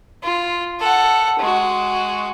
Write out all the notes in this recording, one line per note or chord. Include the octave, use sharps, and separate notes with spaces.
F4
A4 F#5
G#3 F#4